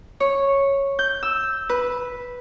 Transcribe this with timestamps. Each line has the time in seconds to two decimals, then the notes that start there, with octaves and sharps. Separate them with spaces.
0.20 C#5
0.99 G6
1.23 E6
1.69 B4